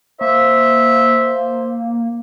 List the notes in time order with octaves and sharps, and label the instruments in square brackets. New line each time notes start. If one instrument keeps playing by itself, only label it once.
[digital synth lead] A#3 [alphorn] C5 [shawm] E5